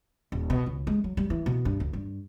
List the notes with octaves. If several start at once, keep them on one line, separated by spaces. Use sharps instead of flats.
D#1
B2
C#2
G#3
F#3
G3
E3
B2
G2
D2
G2